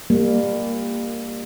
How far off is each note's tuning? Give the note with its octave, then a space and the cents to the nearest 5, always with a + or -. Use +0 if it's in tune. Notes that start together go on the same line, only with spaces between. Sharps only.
G3 +30 A#3 -5